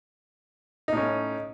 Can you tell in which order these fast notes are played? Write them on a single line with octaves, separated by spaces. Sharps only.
D#4 A2 C#4